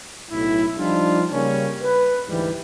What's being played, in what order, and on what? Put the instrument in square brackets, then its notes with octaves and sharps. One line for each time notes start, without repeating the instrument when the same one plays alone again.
[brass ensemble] B1 A2 E4
F3 G3 D4 D#4 F4
C#3 G3 A#3 C#4
B4
D2 G#2 E3 G3